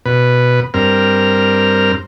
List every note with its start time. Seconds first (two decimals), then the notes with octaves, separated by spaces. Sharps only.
0.06 B2 B4
0.74 G2 C4 A#4 F6